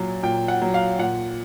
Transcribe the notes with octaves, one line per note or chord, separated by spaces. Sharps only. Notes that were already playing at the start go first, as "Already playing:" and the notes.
Already playing: A#2 F#3
A#2 G5
F#5
F#3
F5
A#2 F#5